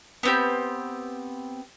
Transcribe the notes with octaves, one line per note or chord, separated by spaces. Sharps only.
B3 C4 G4